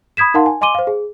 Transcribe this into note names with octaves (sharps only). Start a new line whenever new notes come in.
B5 D#6 G#6 B6 E7
D#4 A#4 F5 F#5 A5 C6
G#5
D#5 G#5 C6 D6 D#7 G7
C5 F5
G#4